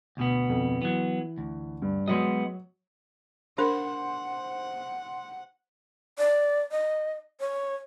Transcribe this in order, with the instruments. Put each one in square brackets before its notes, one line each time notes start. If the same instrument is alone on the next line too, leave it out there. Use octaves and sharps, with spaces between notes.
[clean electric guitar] D2 B2 B3
[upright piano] F2
[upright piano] E3 [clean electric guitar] F#3 B3
[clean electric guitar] D2
[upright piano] G2
[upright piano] F#3 [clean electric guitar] G#3 B3 D#5
[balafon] D4 A#4 [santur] C5 [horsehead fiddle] F#5
[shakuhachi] D5
D#5
C#5